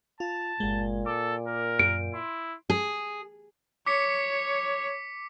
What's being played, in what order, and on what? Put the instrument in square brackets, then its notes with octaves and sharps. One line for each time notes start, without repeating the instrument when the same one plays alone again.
[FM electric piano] F4 [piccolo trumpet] A5
[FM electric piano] G1 G#3 [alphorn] A#2
[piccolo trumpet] A4 [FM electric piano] D6
[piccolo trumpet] A#4
[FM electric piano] F#2 [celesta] D7
[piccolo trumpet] E4 [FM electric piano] C6
[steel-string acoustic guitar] G#4
[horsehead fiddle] C#5 [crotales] D6 B6 C#7